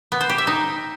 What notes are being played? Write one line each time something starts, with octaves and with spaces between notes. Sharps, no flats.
B3
C5
G4
E5
D#4